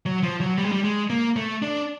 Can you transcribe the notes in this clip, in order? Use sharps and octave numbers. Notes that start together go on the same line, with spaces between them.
F#3
F3
F#3
G3
G#3
G3
G#3
A#3
A3
D4